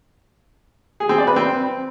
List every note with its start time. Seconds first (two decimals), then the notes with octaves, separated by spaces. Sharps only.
1.00 G#4
1.09 C4
1.18 D5
1.27 B4
1.36 C4